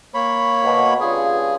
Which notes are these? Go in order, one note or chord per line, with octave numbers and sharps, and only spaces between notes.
A#3 C#5 B5
B2
G2 C#3 F4 G#4